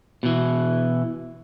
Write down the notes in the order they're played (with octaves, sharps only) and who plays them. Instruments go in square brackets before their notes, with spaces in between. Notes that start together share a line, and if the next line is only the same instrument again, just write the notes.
[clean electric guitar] B2 E3